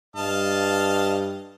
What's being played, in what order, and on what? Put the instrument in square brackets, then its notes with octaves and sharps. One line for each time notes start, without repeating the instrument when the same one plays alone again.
[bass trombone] G2 [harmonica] D#5 F5 A5